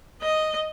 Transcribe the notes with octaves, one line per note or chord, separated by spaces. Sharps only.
D#5